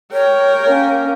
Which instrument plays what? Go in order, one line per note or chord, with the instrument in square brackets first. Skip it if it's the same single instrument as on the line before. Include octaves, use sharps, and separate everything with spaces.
[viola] A#4 G5 [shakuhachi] C#5
[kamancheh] A#3 C#4